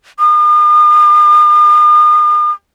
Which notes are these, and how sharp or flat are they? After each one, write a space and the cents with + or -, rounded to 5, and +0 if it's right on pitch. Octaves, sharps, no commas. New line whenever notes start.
D#6 -45